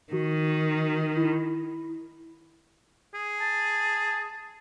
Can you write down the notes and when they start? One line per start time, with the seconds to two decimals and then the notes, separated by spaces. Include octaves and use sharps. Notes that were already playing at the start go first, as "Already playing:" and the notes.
0.13 D#3 F#4
1.16 E4
3.14 G#4
3.41 A5